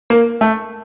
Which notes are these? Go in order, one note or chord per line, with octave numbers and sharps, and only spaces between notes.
A#3
A3